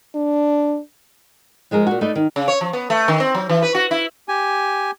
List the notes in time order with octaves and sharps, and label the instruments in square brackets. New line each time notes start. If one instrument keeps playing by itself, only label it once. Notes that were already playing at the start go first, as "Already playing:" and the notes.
[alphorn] D4
[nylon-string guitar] F3 G#3 G#4 A#4
A#2 F#4
A3 D#4 A4 B4 D5
D#3
[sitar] C#3
C#5
F3
B3
A3
D#3
C4
F#3
E3
B4
F#4
E4
[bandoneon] G4 G#5